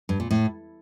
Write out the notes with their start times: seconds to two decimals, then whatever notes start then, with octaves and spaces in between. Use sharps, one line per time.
0.09 G2
0.20 A#2
0.31 A2